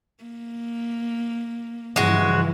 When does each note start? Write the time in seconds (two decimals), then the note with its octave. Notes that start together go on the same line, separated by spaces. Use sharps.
0.24 A#3
1.96 G2 C#3 E3 F3 G#3 F#4